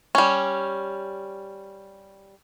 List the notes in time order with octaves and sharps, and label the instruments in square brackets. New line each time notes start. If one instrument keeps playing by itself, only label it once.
[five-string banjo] G3 C#4